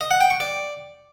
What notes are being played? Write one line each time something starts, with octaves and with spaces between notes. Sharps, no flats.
D#5
F#5
G5
C#6
D5